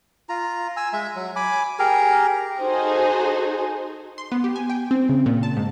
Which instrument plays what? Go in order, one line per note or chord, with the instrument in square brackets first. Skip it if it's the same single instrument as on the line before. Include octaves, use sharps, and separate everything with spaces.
[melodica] F4 A#5
G#5 E6
G#3 E5
F#3
G#5 B5 D6
G4 G#4 A#4 A#5
[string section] D#4 F#4 G#4 A4 C5
[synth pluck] C6
B3
G4
G#5
G5
C4
C#3
A#2
A5
G#2